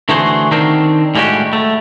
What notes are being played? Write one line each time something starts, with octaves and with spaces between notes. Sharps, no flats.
D3 E3 A3 F#4 G#4 C5
D#3 C4 D4 A#4 C5
A2 G3 G#3 E4 F#4 G4
A3